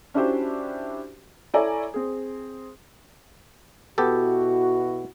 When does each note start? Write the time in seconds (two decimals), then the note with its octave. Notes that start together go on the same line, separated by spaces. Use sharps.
0.14 C#4 D4 E4 F#4 G4 C5
1.54 E4 A4 C#5 D5 G#5 A#5
1.94 C4 G#4
3.98 B2 B3 E4 F#4 G4 A4